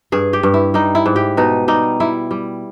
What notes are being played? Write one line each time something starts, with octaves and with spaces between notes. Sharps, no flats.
G2 G#4
G4
G2
E4
G3 D#4
E4
G#2
G4
B2 D#4
G3 D#4
G3 E4
G3